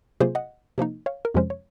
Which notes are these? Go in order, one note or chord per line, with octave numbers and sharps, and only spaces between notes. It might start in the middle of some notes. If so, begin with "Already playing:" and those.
C3 F#3 A#3 F4 G#4 C5
D#5 F#5
C3 F3 A#3 D#4
C#5 F5
A#4
F2 C3 F3 G#3 C#4 C5
C#5